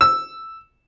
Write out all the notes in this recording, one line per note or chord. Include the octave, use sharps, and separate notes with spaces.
E6